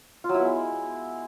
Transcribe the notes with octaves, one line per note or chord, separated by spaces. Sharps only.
F4
F#3
E4
B3
G#3